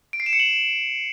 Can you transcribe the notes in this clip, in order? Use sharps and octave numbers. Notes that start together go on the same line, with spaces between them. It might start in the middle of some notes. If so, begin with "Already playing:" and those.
D7
C7
E7
C#7
F#7